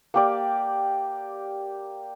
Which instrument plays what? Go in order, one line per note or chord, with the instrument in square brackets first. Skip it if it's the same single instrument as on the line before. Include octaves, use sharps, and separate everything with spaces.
[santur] A#3 G4 D5